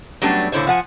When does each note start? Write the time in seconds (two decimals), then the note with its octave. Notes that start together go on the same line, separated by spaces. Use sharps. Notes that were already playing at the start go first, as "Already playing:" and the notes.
0.22 F#3 G3 A3 B3 C#4 D4
0.52 A#2 D3 E4 C5 C#5
0.67 F3 F#5 G#5